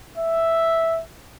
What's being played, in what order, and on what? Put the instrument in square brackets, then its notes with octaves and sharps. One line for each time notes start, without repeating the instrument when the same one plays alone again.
[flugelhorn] E5